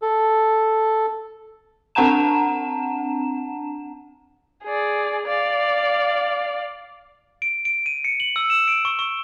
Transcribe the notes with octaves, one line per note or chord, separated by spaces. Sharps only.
A4
C4 D4 F#5 A5 A#5 E7
G#4 D5
D5 F5
D7
D7
D#7
C#7
F#7
E6
E7
D7
C#6
C#6